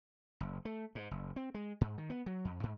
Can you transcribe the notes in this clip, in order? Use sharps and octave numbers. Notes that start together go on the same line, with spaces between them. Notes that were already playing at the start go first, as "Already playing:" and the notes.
F#1
A3
G#2
F#1
C4
G#3
G#2
D#3
B3
F#3
F2
G#2